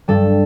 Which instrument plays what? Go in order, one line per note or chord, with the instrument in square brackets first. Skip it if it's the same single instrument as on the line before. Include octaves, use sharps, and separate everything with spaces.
[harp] G2 G3 A4